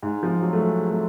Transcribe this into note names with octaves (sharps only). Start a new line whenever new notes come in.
G#2
F3
F#3
A3
G#3
A3